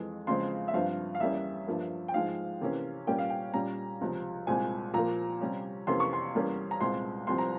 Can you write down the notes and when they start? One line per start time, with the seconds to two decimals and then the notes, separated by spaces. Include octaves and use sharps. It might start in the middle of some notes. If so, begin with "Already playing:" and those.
Already playing: F2 E3 G#3
0.27 E2 C#3 F3 G#3 C4 C6
0.68 E5
0.74 G2 F3 C4 F5
1.15 F5
1.20 E2 E3 G3 A#3 C#4 E5
1.67 G2 F3 A#3
2.08 G5
2.14 G#2 F3 G#3 F5
2.61 C3 E3 A#3 C#4
3.07 A#2 G3 A#3 C#4 G5
3.18 F5
3.30 G5
3.53 A#2 G3 C#4 A#5
4.01 C#2 C3 F3
4.47 C2 A#2 G#3 C4 G#5
4.93 A#2 F3 A#3 A#5
5.41 C3 G3 C#4
5.87 F2 C3 E3 A#3 C#4 C6
6.00 C#6
6.13 C6
6.34 E2 E3 G3 A#3 C#4
6.71 A#5
6.80 C2 A#2 G#3 C4 C6
7.27 C2 C3 F3 C4 C6
7.38 A#5